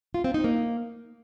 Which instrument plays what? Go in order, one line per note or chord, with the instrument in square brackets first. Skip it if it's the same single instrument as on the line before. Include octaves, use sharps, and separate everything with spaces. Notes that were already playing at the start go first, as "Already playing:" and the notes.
[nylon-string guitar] F4
C4
D#4
A#3